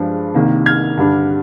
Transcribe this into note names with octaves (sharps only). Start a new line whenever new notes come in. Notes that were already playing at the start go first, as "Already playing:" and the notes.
Already playing: G2 F3 G#3 D4
C2 C3 D#3 A#3
F6 G#6
G2 D3 G3 D4